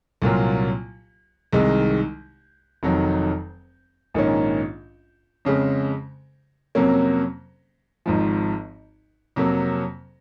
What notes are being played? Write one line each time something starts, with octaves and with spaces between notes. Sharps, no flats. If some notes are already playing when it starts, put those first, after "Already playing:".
C2 A#2 F#3 A#3 F4
C2 C3 D#3 G#3 D#4
F1 F2 D#3 F#3
A#1 G#2 D#3 A#3 C#4
F2 C#3 G#3
F2 C3 F#3 A#3 C#4
G#1 G#2 F3
F2 C3 F#3 A#3